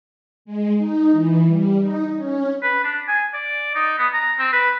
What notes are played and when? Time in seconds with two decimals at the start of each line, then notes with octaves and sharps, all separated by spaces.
0.45 G#3
0.78 D#4
1.12 E3
1.46 G3
1.80 D#4
2.16 C#4
2.62 B4
2.84 D4
3.08 G#5
3.34 D5
3.75 D#4
3.98 B3
4.14 A#5
4.39 C4
4.53 B4